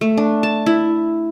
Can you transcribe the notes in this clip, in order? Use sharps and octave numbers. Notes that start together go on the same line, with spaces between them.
A3
D4
A5
E4